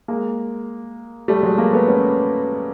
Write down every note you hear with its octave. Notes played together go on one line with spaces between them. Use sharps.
G#3 A#3
G3 A3
F#3 G#3
G#3 A#3
A3 B3
B3 C#4